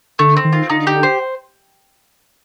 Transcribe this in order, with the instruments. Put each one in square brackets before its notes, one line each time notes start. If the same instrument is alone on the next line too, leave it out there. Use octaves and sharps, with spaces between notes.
[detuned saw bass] D3 [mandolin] A3
[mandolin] C4
[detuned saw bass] D#3
[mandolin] F4
[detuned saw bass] D3 [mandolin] D#4
[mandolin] G4
C5